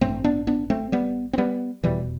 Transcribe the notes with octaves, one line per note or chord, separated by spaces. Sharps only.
A1 G2 D3 A3 C4
B3 D4
B3 D4
A3 C4
G3 B3
C4
G3 B3
F1 E2 B2 E3 G3